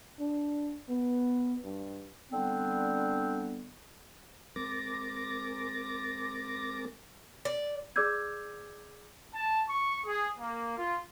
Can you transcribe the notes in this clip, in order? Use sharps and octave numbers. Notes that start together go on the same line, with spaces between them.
D4
B3
G2
D3 G3 B3 C4 D4
G#3 C4 A#4 D6 A6 A#6
D5
G#4 D5 D6 E6 G6 G#6
A5
C#6
G#4
A#3
F4